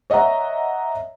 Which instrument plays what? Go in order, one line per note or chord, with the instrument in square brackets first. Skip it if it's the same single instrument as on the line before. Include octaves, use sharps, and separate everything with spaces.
[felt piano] C#5 D#5 E5 F#5 A#5